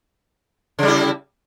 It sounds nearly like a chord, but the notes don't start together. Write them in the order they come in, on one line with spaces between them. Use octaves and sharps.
C#3 G3 E4